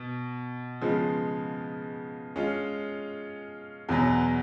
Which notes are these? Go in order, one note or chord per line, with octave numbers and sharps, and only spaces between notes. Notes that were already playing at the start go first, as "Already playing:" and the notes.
Already playing: B2
C#3 F3 G#3 B3
G#3 C#4 F4
E2 B2 F#3